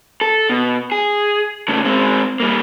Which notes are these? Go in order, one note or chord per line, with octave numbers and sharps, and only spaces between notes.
A4
B2
G#4
C#3 A3
G#3 C4
G3 A#3